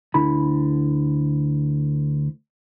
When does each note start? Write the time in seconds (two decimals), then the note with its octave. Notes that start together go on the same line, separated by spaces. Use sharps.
0.14 D2 D3 E4 B5